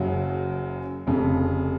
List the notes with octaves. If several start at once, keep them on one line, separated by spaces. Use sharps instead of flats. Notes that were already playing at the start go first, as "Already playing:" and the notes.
Already playing: F#1 F#2 C#3 F#3
F1 F2 C#3